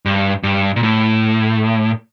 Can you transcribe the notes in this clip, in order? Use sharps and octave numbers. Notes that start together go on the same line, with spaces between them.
G2
G2
A#2
A2